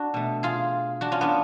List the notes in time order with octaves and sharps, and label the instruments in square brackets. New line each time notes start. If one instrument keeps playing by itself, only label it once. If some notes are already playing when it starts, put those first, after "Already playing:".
Already playing: [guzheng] D4 F#4
B2 A3
F4 G#4
D4 F#4
C#4 F4
B3 D4